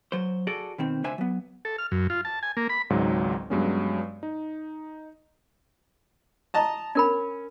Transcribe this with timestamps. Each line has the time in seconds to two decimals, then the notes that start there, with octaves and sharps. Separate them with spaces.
0.12 F#3 C5
0.47 F#4 G#4 A4 D5
0.78 B2 D#3 C4
1.04 C#2 D4 C5 E5 G#5
1.18 F#3 B3
1.65 A4
1.78 F6
1.92 F#2
2.10 F4
2.25 A5
2.43 G#5
2.57 A#3
2.69 B5
2.90 G#1 C#2 G#2 F#3
3.50 G2 F#3 G#3 B3 C#4
4.23 D#4
6.54 D#5 A5 A#5
6.95 C#4 D4 A#4 B5